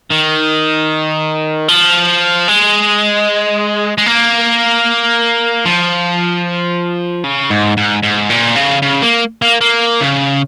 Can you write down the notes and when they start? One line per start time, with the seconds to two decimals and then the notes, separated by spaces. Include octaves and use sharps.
0.10 D#3
1.68 F3
2.48 G#3
3.98 G#3
4.06 A#3
5.65 F3
7.24 C#3
7.50 G#2
7.77 G#2
8.03 G#2
8.30 A#2
8.56 C#3
8.82 C#3
9.02 A#3
9.42 A#3
9.61 A#3
10.01 C#3